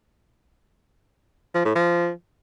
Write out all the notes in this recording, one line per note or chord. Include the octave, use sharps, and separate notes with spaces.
F3
A2
F3